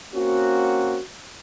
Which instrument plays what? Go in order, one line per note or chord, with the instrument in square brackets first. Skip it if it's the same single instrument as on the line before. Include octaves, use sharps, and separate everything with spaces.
[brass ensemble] A#3 C4 C#4 F#4